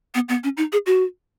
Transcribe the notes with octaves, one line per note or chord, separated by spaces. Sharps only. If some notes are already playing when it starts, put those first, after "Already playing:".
B3
B3
C#4
D#4
G#4
F#4